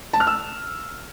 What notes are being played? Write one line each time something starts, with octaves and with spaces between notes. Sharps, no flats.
A5
F6
E6